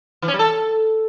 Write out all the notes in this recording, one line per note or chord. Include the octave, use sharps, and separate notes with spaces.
E3
C#4
G3
A4